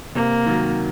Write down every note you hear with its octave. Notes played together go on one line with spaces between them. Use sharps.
C3 A#3
D#3 F#3